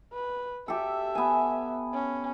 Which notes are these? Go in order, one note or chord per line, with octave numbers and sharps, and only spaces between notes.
B4
G4 A4 E5
B3 G#5
C#4